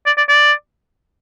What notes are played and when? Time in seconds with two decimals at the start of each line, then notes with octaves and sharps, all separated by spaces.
0.07 D5
0.18 D5
0.29 D5